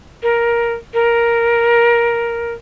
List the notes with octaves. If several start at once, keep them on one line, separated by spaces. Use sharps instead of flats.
A#4
A#4